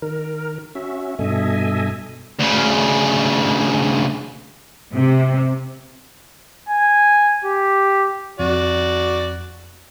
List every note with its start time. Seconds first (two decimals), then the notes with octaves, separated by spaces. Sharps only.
0.02 D#3 A#4
0.75 C#4 F#4 E5
1.19 G2 B2 A4 D#5 E5 G#5
2.40 D2 C#3
4.94 C3
6.69 G#5
7.44 G4
8.39 F2 F#4 D5